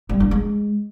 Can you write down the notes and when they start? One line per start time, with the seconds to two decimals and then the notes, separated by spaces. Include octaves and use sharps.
0.09 G3
0.20 D4
0.31 G#3